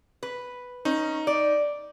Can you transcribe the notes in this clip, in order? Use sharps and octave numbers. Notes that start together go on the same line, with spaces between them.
B4
C#4 D#4
D5